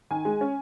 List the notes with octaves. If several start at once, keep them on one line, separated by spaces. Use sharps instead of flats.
D#3 G#5
G#3
C#4